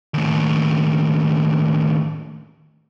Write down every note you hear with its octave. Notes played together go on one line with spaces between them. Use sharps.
D#2 A2